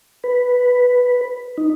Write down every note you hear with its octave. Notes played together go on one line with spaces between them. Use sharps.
B4
D#4